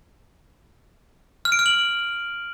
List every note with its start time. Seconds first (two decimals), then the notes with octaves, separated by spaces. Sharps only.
1.45 F6
1.52 D7
1.59 F6
1.66 F#7